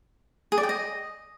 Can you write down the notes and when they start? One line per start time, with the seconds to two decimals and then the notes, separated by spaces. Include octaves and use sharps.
0.52 G#4
0.58 D5
0.63 G5
0.69 D#5